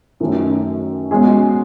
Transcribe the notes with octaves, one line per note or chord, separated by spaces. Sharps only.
F#2 D#3 A3 C#4
B2 G#3 C#4 G#4